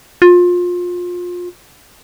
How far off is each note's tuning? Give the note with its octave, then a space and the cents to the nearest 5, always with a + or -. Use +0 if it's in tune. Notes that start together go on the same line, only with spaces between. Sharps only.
F4 +25